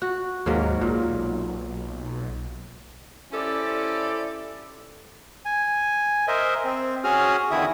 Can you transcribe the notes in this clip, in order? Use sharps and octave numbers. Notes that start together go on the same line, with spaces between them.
F#4
D#2 G#2 F#3 A#3
B1 A#2
C#4 E4 G4 A4 C5 D5
G#5
A#4 C5 D#5 E5
C4
C#4 F#4 G#4 D#6 F6
E2 D3 D#3 E4 E5 D#6